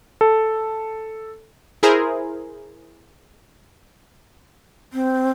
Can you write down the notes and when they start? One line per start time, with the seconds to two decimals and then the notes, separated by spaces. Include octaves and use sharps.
0.21 A4
1.83 E4 G#4 A#4 C5
4.93 C4